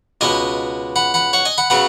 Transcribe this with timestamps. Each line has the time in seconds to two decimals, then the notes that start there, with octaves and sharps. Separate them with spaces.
0.21 C#2 B2 B3 D#5 G#5
0.96 F#5 B5
1.14 F#5 B5
1.33 C#5 F#5
1.45 D#5 G#5
1.58 F#5 B5
1.70 C#3 F#3 B3 F#5 B5